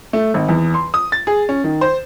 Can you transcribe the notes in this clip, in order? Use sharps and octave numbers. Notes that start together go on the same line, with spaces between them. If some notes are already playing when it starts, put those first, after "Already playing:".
A3
G#1
E2
C6
D#6
A6
G#4
C#4
D#3
C5